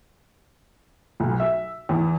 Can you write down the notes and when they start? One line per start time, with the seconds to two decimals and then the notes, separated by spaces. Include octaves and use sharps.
1.20 B1
1.40 E5
1.89 E2